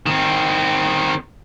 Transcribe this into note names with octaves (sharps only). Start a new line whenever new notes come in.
D#3 C4